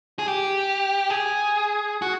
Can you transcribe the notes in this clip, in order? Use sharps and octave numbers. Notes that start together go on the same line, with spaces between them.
G#4
G4
G#4
F#4